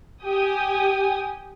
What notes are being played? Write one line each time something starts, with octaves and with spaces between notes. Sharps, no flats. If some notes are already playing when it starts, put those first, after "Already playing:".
G4 G5 G#5 D#6